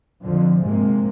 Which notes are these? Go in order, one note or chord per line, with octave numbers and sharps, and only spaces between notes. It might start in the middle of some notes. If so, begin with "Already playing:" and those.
F2 D3 F3
G#2 C3 G#3 A#3